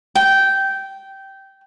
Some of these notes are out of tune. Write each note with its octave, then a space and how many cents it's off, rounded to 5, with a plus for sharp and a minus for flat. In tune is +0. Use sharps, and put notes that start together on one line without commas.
G5 -15